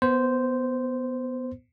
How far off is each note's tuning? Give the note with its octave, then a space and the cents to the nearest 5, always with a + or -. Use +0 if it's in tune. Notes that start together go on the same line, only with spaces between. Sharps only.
B3 +5 C5 -10